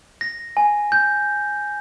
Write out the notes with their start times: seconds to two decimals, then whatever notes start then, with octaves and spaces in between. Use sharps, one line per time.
0.21 A#6
0.57 G#5
0.92 G6